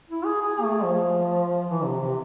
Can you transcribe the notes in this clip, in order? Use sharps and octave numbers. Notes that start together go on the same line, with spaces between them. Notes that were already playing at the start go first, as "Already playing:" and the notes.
E4
G#4
G#4
A3
F3
E3
C3
C3